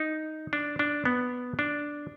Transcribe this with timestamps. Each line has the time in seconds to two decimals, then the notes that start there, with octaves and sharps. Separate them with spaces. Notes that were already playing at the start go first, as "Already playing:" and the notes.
Already playing: D#4
0.53 D4
0.79 D4
1.05 B3
1.59 D4